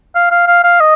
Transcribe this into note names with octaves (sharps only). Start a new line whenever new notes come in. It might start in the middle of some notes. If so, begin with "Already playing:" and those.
F5
F5
F5
F5
D#5